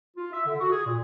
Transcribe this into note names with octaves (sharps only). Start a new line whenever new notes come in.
F4
E5
D3
F#4
G#4
A#2